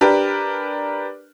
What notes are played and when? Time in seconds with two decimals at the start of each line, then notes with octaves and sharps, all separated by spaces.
0.01 D4 G4 A#4 B4